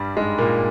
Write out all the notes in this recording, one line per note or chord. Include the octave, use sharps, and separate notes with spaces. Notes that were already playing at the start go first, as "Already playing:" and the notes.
Already playing: G2 G3
G#2 G#3
A#2 A#3